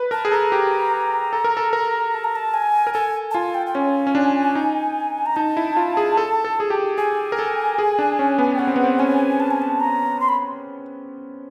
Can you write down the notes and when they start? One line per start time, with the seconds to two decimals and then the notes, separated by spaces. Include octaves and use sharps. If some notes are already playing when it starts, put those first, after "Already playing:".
Already playing: B4
0.11 A#4 A5
0.25 G#4
0.32 A4 A#5
0.52 G4
1.33 A4
1.44 A#4
1.57 A4
1.73 A#4
2.14 A5
2.24 A#5
2.36 A5
2.54 G#5
2.87 A#4
2.94 A4 G#5
3.31 A5
3.34 F4 G#5
3.55 G5
3.66 G5
3.75 C#4 G#5
4.07 C#4
4.15 D4
4.55 D#4
5.26 A#5
5.36 D#4 A5
5.57 E4
5.77 F4
5.97 G#4
6.17 A4
6.45 A4
6.60 G#4
6.70 G4
6.98 G#4 G#5
7.32 A#4
7.39 A4
7.78 G#4
7.99 D4
8.19 C#4
8.38 B3
8.55 G5
8.59 C#4 F#5
8.67 C4
8.76 B3
8.84 C4
8.99 C#4 G#5
9.40 A5
9.50 G#5
9.62 A5
9.80 A#5
10.20 C6
10.28 B5